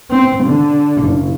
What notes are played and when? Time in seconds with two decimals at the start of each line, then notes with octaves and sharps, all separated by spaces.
0.11 C4
0.44 D3
1.03 F#1